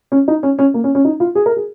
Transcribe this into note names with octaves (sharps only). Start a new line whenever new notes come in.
C#4
D#4
C#4
C#4
A#3
C#4
C#4
D#4
F4
G#4
A#4
G#4